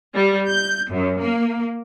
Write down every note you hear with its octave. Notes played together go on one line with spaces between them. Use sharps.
G3
G6
F#2
A#3